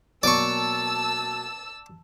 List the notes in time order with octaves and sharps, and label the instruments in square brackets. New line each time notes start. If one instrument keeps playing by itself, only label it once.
[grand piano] B2 F#3 A#3 [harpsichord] D5 C#6 [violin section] A5 E6